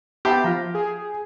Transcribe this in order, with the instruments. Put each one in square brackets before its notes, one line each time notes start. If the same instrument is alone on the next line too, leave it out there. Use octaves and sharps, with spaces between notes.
[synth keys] B3 A5 [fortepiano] G4 [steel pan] E5 B5 C6
[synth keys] F3 [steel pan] F4 F5 A#5
[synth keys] G#4